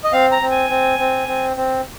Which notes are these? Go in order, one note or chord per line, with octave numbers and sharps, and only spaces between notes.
D#5
C4 F5
A#5
C4
G#5
C4
C4
C4
C4